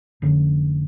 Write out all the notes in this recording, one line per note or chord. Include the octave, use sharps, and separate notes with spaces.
F1 D3 C#4